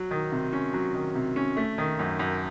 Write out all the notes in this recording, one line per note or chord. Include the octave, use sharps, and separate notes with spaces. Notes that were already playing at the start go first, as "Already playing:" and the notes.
Already playing: F#3
D#3
C3
C#4
F#3
D#3
C3
C#4
A3
D#3
F#2
F#2